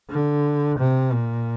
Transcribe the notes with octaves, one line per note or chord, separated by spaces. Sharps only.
D3
C3
A#2